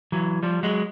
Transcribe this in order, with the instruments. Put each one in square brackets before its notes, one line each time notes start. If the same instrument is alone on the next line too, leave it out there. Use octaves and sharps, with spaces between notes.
[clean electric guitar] E3 F#3
F3 G3
F#3 G#3